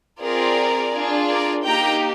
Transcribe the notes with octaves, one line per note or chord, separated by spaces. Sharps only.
C4 F4 G#4 A#4 D5
D4 F4 G#4
A#4 D5
A#3 D#4 G4 G5 A#5